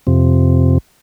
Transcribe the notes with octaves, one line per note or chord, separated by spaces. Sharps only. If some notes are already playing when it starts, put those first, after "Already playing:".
F2 C3